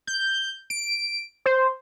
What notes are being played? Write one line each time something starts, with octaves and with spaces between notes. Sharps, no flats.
G6
D7
C5